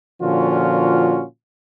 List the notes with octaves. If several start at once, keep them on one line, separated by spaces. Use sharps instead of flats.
A#2 D3 F3 C#4 F4 F#4